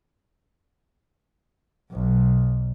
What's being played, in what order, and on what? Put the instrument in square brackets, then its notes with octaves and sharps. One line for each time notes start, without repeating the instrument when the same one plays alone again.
[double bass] B1